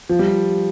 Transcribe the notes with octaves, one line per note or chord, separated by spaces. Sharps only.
F3
G3